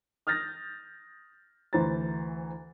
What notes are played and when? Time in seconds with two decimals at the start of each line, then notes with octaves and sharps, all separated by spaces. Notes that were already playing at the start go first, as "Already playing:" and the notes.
0.27 D#6 F6 G6 A6 A#6
1.73 D2 E3 C5 A#5 A6